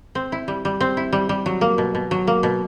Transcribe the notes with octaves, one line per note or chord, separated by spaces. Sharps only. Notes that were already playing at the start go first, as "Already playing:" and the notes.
C4
E4
G3
G3
C4
E4
G3
G3
F#3
A#3
B2
B2
F#3
A#3
B2